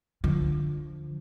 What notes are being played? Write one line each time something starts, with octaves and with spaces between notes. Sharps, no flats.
D3 F3